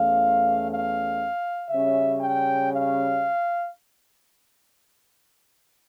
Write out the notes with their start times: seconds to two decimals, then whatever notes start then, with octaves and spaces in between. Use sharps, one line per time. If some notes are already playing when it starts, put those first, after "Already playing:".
Already playing: E2 E3 A3 C#4 F5
0.69 F5
1.70 C#3 G3 C#4 E5
2.20 G5
2.71 F5